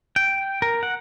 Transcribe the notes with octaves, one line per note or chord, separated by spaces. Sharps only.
G5
A#4
F#5